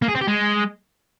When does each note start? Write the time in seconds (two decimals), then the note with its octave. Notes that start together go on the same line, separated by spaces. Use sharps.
0.02 A#3
0.08 G#4
0.15 C4
0.21 G4
0.27 G#3